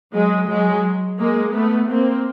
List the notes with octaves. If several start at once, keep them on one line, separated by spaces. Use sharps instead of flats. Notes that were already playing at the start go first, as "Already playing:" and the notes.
F#3 G#3
F#3 G#3
G#3 A#3
A3 B3
A#3 C4